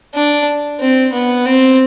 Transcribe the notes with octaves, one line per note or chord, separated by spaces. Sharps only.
D4
C4
B3
C4